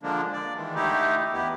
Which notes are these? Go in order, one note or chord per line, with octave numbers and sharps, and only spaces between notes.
D3 F3 G#3 A#3 D4
D5
D#3 E3 G#3
D3 A3 D#4 E4 G4
E2 B3 E4 G4